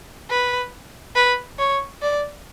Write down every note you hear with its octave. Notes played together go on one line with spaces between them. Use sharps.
B4
B4
C#5
D5